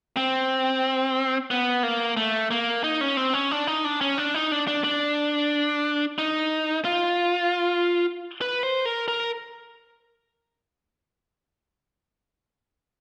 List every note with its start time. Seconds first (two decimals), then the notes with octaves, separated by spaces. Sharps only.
0.17 C4
1.51 B3
1.83 A#3
2.17 A3
2.51 A#3
2.84 D#4
3.01 C#4
3.17 C4
3.33 C#4
3.51 D4
3.67 D#4
3.85 D4
4.01 C#4
4.18 D4
4.34 D#4
4.52 D4
4.67 D4
4.84 D4
6.18 D#4
6.85 F4
8.41 B4
8.63 C5
8.85 A#4
9.08 A#4